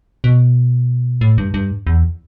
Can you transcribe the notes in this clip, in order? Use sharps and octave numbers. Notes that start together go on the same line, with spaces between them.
B2
A2
G2
G2
E2